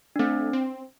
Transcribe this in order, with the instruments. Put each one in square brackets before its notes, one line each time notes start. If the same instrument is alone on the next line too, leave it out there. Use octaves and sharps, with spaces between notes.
[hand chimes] D4
[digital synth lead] A3 [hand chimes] C4
[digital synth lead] C4